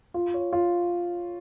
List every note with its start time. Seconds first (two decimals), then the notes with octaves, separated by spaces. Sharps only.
0.14 F4
0.34 C#5
0.53 F4